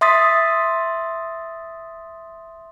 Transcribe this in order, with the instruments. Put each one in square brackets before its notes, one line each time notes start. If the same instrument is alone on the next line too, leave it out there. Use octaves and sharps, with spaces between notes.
[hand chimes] E5 C6 D#6 A6 B6